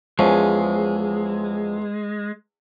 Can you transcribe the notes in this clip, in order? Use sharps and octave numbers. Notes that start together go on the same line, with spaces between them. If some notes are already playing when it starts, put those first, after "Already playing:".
E2 F3 G#3 C#4